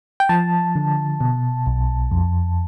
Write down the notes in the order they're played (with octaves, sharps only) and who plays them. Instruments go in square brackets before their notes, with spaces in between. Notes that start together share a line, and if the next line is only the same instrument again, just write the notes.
[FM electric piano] G5
F3 A5
D3
B2
B1
F2